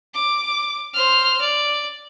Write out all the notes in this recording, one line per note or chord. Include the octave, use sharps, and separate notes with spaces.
D6
C5 F6
D5